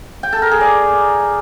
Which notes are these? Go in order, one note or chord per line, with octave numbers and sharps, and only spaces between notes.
G5
A4
A#4
G#4
D5